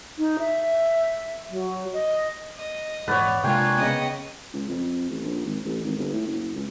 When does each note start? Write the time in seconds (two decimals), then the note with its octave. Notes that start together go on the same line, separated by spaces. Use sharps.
0.19 D#4
0.39 E5
1.50 F#3
1.93 D#5
2.57 D#5
3.08 A#1 E2 G#2 B3 B4 C#5 D5
3.44 C3 G#3 A#3 D4 F4 G5 G#5
3.77 C#3 B3 D#5
4.53 C#2
4.69 F2
5.09 A1
5.24 A#1
5.45 G#1
5.65 A1
5.84 G#1
5.98 G1
6.13 A2
6.27 F#1
6.55 C#2